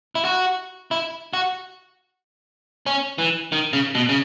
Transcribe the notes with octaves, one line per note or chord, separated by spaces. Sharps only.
E4
F#4
E4
F#4
C#4
E3
D#3
C#3
B2
C#3